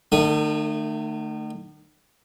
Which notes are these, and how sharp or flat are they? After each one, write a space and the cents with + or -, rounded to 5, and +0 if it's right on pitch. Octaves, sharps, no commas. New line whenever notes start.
D#3 -40 A3 +20 D#6 -15